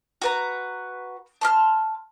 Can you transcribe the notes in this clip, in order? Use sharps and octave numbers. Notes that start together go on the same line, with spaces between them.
F#4 B4 A#5
A5 C6 F6